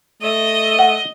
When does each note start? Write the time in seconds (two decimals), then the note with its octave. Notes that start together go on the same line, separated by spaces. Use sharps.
0.23 A3 D#5
0.79 F#5